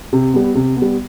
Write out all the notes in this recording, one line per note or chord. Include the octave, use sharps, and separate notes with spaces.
C3
G3 B3
C3
B3
G3